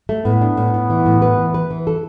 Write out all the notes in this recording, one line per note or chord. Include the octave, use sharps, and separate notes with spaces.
A3
A2 B3
D4
A2
A2
E3
A2
B4
E3
B4
E3
A4